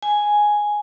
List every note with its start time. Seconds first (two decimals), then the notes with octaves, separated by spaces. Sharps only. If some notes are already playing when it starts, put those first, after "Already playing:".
0.03 G#5